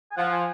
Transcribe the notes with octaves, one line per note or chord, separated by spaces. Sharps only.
G#5
F3 F#5
G#5